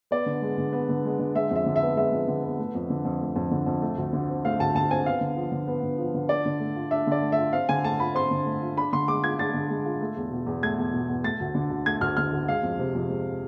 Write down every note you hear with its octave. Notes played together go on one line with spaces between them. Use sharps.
B3 D5
D3
G#3
D3
B3
D3
G#3
D3
G#3 E5
F2 E5
D3
E5
B3
G#3 E5
F2
D3
B3
A3
F2
D3
F2
A3
F2
D3
F2
A3
D2
D3
C4
A3 F5
D2 A5
D3 A5
C4 G#5
B3 F5
D3
F3
D3
B3
D3
F3
D3
D4 D5
D3
A3
F4
D4 E5
D3 D5
A3
E5
F4
C4 F5
D3 G#5
A3 A5
F4 B5
C4 C6
D3
A3
F4
D4 B5
D3 C6
G#3 D6
F4 G#6
D4 A6
D3
G#3
F4
A3
E2
B2
E2
A3 G#6
E2
B2
E2
A3 A6
D2
D3
D2
A3 G#6
D2 F6
D3 F6
D2
G#3 F5
F2
C3
F2
G#3